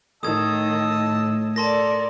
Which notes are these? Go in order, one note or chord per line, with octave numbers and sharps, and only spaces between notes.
A2 D#3 D#5 A5 D#6 E6 G#6
A4 A#4 D5 A5 C6 A#6